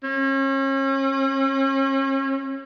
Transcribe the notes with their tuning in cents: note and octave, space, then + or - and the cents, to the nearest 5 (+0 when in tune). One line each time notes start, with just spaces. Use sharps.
C#4 -40